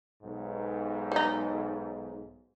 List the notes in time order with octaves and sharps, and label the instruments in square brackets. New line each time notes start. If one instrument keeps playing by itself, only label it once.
[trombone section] B1 G#2
[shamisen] G3 D#4